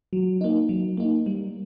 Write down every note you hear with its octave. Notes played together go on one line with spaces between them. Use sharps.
F#3
A#3 D#4
F#3
A#3 D#4
G3